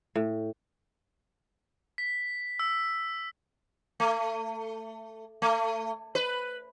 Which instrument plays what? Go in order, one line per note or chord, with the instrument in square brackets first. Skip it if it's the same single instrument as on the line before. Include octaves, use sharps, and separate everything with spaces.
[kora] A2
[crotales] B6
E6
[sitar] A3
A3
B4